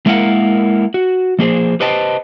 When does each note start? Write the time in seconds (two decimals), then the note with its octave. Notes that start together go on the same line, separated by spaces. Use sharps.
0.06 G#3 A#3 E4 A#4 F5 F#5
0.94 F#4
1.39 F3 A#3 G#4 C5
1.80 G4 B4 C5 D#5 G5 A5